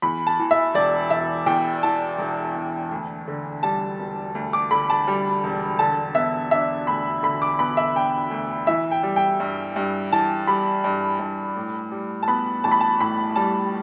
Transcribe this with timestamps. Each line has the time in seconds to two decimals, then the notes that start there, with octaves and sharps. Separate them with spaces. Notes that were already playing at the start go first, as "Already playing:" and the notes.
0.02 E2 B5
0.27 A5
0.39 E3
0.51 E5
0.74 E1 D5
1.10 E1 E5
1.46 E2 G5
1.83 E3 A5
2.18 E1
2.56 E1
2.91 D2
3.28 D3
3.63 G3 A5
4.00 E1
4.35 D2
4.53 D6
4.71 D3 B5
4.90 A5
5.08 G3
5.44 E1
5.79 D3 A5
6.15 B3 E5
6.51 D4 E5
6.87 D2 B5
7.23 D3 B5
7.42 D6
7.59 B3 B5
7.77 E5
7.95 D4 G5
8.31 D2
8.67 E3 E5
8.91 G5
9.03 G3
9.16 G5
9.40 G2
9.76 G2
10.12 E3 A5
10.47 G3 B5
10.84 G2
11.19 G2
11.56 A2
11.92 G3
12.23 A5
12.28 B3 B5
12.64 A1 A5
12.72 B5
12.81 A5
13.00 A2 B5
13.36 G3 A5